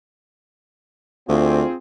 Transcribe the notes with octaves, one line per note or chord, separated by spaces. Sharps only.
D2 C4 F4 G#4